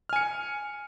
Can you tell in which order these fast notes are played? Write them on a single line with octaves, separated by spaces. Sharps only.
F6 G#5 C#7